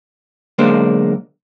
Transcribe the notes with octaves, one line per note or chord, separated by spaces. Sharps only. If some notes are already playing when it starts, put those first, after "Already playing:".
B1 D3 G#3 A#3 C5